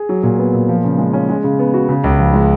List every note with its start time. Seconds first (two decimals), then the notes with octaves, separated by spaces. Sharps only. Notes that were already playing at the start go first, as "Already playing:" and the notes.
Already playing: G#4
0.09 F#3
0.23 A#2
0.39 B3
0.54 A#2
0.69 F3
0.84 C#3
0.98 G#3
1.13 C#4
1.29 G#3
1.44 C#3
1.59 B3
1.74 F#4
1.89 C#3
2.04 C#2
2.19 F3
2.34 G#3